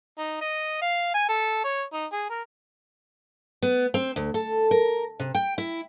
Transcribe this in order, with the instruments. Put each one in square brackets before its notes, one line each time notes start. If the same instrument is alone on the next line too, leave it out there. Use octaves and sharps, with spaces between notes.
[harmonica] D#4
D#5
F5
G#5
A4
C#5
D#4
G#4
A#4
[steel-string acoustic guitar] B3
C4
D2
A4
A#4
C3
G5
E4